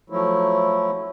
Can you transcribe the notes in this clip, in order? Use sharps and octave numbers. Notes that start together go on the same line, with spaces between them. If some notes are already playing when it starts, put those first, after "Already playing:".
F3 F#3 A3 E4